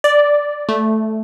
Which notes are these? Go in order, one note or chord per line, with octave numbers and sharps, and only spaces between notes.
D5
A3